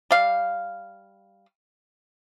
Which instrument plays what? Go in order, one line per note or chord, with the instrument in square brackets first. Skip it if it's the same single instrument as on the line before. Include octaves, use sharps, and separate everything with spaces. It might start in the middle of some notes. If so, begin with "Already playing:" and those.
[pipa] G3 F5